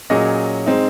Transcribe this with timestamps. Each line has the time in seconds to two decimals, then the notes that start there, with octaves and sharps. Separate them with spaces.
0.10 A#2 F#3 C#4 G#4 D#5
0.66 G#3 C4 D#4